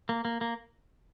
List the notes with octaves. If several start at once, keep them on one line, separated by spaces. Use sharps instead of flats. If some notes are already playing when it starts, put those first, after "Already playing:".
A#3
A#3
A#3